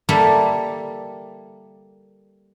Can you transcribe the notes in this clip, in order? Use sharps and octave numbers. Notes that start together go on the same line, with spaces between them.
G3 A#3 E4 G4 A4 D5